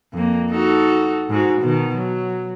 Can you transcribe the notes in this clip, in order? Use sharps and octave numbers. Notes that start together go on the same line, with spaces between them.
F2 A#3
D#4 F#4 A4
G#2 F#4
B2 D#3
F#3